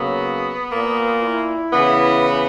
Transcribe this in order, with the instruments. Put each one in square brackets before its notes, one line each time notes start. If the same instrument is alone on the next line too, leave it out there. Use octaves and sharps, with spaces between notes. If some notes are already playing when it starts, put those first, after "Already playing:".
Already playing: [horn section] C#3 F#3 A#3 B3
A#2 A#3
E4
C#3 E3 B3